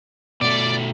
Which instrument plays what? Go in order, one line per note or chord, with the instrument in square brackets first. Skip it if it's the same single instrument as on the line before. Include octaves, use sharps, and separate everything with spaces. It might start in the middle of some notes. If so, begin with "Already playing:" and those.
[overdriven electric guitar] B2 A3 [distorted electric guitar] D5